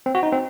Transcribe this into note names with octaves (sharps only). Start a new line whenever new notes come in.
C4
F#4
D#4
C4